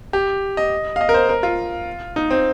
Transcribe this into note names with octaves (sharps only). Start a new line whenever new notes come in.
G4
D#5
F5
D#5
A#4
C5
A#4
F4
D#4
C4